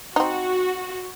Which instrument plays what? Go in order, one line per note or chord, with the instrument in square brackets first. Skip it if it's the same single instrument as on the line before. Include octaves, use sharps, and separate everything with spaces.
[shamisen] C4 D#4 [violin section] F#4